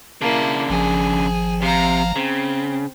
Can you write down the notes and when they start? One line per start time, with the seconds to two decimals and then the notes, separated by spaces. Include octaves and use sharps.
0.21 C#3 A#3 D4 E4
0.70 G#1 F3 G#4
1.62 C3 F5 A#5
2.16 C#3 C4